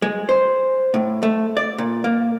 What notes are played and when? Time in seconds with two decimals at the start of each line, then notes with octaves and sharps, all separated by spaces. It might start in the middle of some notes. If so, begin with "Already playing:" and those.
0.02 G#3
0.29 C5
0.94 A2
1.23 A3
1.57 D5
1.78 A#2
2.04 A#3